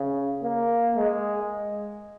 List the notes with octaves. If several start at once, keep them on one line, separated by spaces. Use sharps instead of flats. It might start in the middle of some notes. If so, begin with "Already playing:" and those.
Already playing: C#3
A#3
G#3